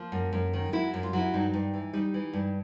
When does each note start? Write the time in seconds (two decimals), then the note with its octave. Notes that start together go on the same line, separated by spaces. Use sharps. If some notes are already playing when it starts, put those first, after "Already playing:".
Already playing: F3 A#3
0.12 F#2
0.33 F#2
0.53 D#3
0.73 F#3 E4
0.94 F#2
1.03 F4
1.13 F#3 E4
1.34 G2 D#4
1.54 G2
1.74 E3
1.93 G3 D#4
2.14 E3
2.33 G2